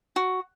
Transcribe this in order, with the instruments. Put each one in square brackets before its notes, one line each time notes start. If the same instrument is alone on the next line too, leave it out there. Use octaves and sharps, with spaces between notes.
[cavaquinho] F#4